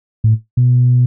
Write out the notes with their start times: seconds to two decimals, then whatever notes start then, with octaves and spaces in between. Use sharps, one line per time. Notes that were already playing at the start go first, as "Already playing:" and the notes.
0.24 A2
0.57 B2